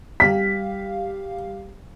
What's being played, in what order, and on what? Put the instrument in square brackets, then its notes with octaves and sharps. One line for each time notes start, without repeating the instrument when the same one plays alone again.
[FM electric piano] G3 G4 F5 [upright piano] B6